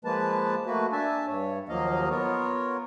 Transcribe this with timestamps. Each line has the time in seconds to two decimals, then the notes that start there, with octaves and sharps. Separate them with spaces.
0.05 F3 G#3 A#3 B4 A5
0.66 A3 A#3 F#4 B4
0.92 D4 E5 G#5 A5
1.27 G2 C#5
1.69 D#2 F3 F#3 A#3 D#5 F5
2.10 B3 F4 A#4 C#5